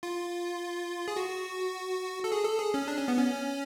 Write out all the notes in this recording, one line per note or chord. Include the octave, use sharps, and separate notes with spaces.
F4
G#4
F#4
A4
G#4
A4
G#4
C#4
D4
C#4
B3
C#4